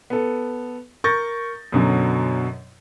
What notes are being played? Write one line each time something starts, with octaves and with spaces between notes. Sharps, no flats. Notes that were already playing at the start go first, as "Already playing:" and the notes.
B3 A4
A#4 C#6 G6 A6 A#6
F#2 B2 D3 F#3